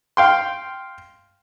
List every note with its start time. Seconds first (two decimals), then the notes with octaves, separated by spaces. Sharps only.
0.17 F5 G5 C6